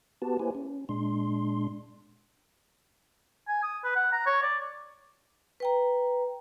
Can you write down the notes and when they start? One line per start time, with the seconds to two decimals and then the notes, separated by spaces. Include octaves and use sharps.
0.22 B3 F#4 G4 B4 A5
0.39 A#3 E4 G4 B4 C5 G#5
0.55 C#4
0.89 A#2 G#3 D4 C6
3.48 G#5
3.63 D#6
3.84 B4
3.96 F#5
4.12 A#5
4.26 C#5
4.43 D5
5.60 B4 G5 A#5